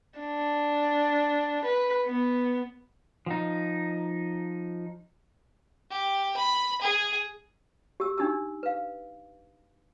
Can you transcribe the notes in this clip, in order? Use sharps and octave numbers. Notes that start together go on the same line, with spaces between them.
D4
B4
B3
F3 D#4
G4
B5
G#4
G4 E6
D4 D#4 G4 E6
B4 F5